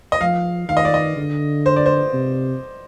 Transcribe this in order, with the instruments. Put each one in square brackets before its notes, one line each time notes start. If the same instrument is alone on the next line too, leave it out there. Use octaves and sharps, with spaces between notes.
[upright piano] D#5
[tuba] F3 [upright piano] F5
[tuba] D#3 [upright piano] F5
[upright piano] D#5
D5
D#5
[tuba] D3
[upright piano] C5
D5
C5
[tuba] C3